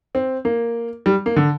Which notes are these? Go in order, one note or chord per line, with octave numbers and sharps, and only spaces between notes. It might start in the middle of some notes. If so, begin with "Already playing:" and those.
C4
A#3
G3
A#3
D3